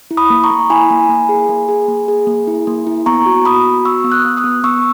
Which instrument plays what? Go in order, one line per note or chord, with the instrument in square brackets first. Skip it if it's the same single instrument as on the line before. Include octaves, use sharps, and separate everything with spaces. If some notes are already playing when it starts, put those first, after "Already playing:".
[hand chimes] E4
B5 D#6
A#3
A#5 C#6
A#3
E4 G#5 B5
A#3
A#3
G#4
A#3
G#4
A#3
G#4
A#3
E4
A#3
E4
B3 A#5 C#6
F#4
B3 B5 D#6
F#4
B3 C#6 E6
B3
D#6 F#6
B3
D#6 F#6
B3
B3 C#6 E6